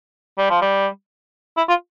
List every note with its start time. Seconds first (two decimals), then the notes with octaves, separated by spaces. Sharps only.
0.38 G3
0.50 F3
0.62 G3
1.57 E4
1.69 F4